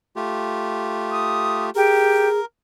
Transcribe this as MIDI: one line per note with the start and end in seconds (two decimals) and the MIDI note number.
0.16 1.70 57
0.16 1.70 65
0.16 1.70 67
1.11 1.64 87
1.75 2.28 67
1.75 2.40 68
1.75 2.45 70